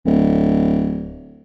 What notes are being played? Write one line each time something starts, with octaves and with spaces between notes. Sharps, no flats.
D1